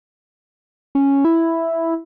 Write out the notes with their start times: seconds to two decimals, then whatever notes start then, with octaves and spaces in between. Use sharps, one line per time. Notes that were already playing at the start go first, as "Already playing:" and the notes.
0.95 C#4
1.25 E4